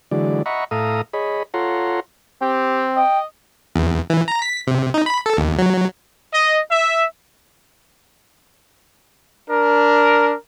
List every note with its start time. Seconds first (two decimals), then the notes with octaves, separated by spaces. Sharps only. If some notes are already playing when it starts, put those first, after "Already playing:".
0.11 D3 E3 F#3 G#3 D5
0.46 D#5 E5 F#5 A#5 B5 C#6
0.71 A2 A4 E5 F5 A#5 D#6
1.13 G#4 C#5 D#5 B5
1.54 F4 A4 C#5 F#5 A#5 C6
2.42 C4 G4
2.96 D#5 G5
3.76 E2
4.10 E3
4.28 A#5
4.42 B6
4.67 C3
4.94 D#4
5.06 B5
5.26 A4
5.37 D#2
5.58 F#3
6.32 D#5
6.71 E5
9.50 D4 A#4